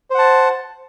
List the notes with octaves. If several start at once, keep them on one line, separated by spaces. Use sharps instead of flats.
C5 F#5 A5